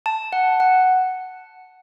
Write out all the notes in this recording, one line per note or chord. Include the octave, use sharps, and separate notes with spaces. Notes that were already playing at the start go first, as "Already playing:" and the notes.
A5
F#5
F#5